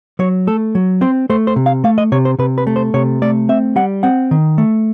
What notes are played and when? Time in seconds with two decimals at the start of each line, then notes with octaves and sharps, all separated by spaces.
0.19 F#3 C#5
0.47 A3 A4
0.75 F#3
1.01 C4 C5
1.30 A3 C5
1.47 C5
1.56 C3
1.66 F5
1.84 A3 F5
1.98 D#5
2.12 C3 C#5
2.25 C5
2.39 C3 B4
2.58 B4
2.67 A3
2.76 C5
2.94 C3 C#5
3.22 A3 D5
3.49 C4 E5
3.76 G3 F#5
4.03 C4 F#5
4.31 D#3
4.58 A3